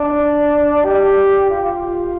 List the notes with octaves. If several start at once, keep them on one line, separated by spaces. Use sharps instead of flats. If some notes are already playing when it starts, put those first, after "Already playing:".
Already playing: D4
G4
F4